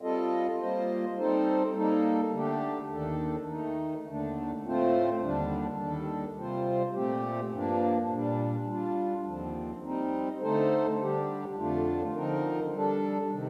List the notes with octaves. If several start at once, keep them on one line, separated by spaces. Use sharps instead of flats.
G3 C4 F4 A4 D#5
G3 A#3 F4 C5 D#5
G3 C4 D#4 A4 C5
G3 A#3 D#4 A4
D3 A3 D4 G4
D#2 D#3 A3 D4 A4
D#3 A3 D#4
D#2 D3 A3 D4
A2 A3 C4 F4 C5
D#2 D3 G3 D4
D#2 D#3 G3 D4 A4
C3 G3 C4 F4 C5
A#2 A3 C4 G4
G2 F3 A#3 D4
A#2 G3 D4
G3 D4 F4
D#2 D3 F3 C4
G3 C4 D#4
D3 A3 D#4 A4 C5
D3 G3 D4 G4
F2 D3 A3 D4 F4
D3 F3 C4 D#4 A#4
G3 D4 A4
C3 D#3